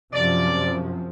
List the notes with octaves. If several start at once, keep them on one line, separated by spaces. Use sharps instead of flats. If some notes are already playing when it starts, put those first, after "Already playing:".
F#2 C3 F3 D5